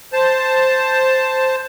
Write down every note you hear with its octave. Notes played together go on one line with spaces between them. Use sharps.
C5 A5